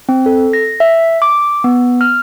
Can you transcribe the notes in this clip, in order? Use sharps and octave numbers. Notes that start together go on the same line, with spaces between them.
C4
A4
A#6
E5
D6
B3
F6